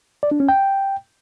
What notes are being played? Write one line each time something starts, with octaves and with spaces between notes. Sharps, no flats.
D5
D4
C#4
G5